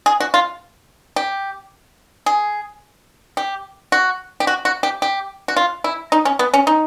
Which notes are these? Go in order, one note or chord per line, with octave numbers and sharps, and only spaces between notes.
G#4
F#4
F4
G4
G#4
G4
F#4
G4
F#4
F#4
G4
G4
F#4
F4
E4
D#4
C#4
B3
C#4
D#4